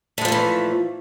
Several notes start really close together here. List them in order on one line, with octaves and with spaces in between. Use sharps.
A3 G#3 F3 A#2 E3